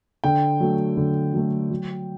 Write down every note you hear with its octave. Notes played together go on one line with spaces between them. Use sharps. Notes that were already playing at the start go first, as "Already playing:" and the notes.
D3 G5
F#3 A3
D3
F#3 A3
F#3